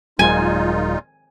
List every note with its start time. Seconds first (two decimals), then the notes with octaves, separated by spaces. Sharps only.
0.19 D#1 A#2 F#3 G#3 D#4 F4 G#5